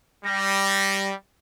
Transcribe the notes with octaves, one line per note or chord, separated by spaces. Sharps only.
G3 A#6